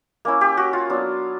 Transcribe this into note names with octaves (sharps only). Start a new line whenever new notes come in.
A#3 C#4 E4
G4
F#4
F4
F#3 B3 D4